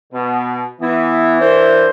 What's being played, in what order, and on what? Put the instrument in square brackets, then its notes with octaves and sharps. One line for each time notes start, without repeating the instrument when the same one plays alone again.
[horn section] B2
[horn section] E3 [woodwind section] B3 E4
[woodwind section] D4 A#4 C5